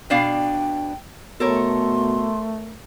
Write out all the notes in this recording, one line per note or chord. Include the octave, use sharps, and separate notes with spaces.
B2 D4 F5 G5
B2 A3 A4 A#4 C#5 C6